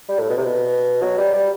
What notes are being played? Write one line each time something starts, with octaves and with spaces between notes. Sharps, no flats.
G3
A2
B2
C3
B2
F#3
G3
G3